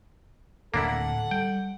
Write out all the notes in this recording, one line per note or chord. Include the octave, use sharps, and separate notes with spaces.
D1 D3 A#3 D4 E4 A4 F#5
G3 G5